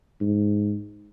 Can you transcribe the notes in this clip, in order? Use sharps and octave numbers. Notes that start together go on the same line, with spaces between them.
G#2